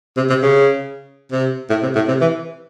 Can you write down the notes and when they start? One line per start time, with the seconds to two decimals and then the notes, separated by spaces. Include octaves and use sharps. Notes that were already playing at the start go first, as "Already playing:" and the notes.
0.17 C3
0.29 C3
0.42 C#3
1.32 C3
1.70 A2
1.83 C3
1.95 A2
2.08 C3
2.21 E3